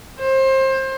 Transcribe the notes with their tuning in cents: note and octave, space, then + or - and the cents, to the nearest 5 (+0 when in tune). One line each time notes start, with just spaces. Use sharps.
C5 +25